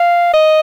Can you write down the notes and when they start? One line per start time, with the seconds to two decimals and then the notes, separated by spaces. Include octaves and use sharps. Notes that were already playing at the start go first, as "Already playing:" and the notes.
Already playing: F5
0.33 D#5